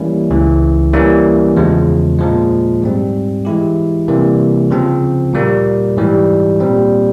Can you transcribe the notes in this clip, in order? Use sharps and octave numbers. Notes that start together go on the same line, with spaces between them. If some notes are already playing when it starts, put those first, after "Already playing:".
Already playing: E3 G3 A#3 C#4 E4
C#2 C#3 E3
E3 G3 A#3 C#4
E2 C#3 F3 G#3
A#2 F3 G#3
G#2 G3 C4
E3 G#3 E4 G4
C3 E3 G3 A#3
C#3 F3 C4
A#2 G3 A#3
G#2 E3 G3
A#2 G3 C4